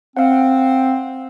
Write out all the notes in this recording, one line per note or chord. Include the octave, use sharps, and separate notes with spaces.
C4 F5 F#5